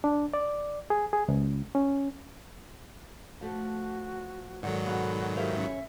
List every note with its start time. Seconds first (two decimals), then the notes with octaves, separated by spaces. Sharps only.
0.04 D4
0.34 D5
0.90 G#4
1.13 G#4
1.28 C#2
1.75 C#4
3.41 F3 A3 F#4
4.63 G#2 D#3 F#3 A4 D5 F#5
4.86 B2 G#3 F#4 F5
5.37 E4 G4 A#4 C5 E5 F5
5.56 C#4 C#5